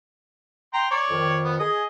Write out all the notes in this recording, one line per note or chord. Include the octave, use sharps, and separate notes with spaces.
G5 A#5 C6
C#5 D5
F2 D#3
B3
G#4 D#5